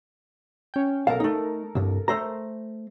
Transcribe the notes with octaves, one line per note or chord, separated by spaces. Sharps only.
C#4 G5
B1 A4 A#4 F5
A3 D#4
C2 G2
A3 C5 A#5